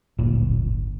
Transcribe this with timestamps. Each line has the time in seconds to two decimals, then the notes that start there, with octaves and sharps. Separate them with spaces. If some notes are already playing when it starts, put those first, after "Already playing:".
0.18 D1 G1 A#2